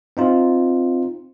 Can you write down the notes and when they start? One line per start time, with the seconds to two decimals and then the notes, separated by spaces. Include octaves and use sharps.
0.17 C4 D#4 F4